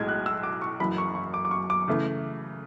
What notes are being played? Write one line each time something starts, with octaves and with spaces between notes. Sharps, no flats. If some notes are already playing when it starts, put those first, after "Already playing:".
Already playing: B1 A2 G#3 G#6
F#6
E6
D6
C#6
F#1 F#2 E3 B5
C#6
C#6
D6
D6
C#6
D6
C#3 E3 A3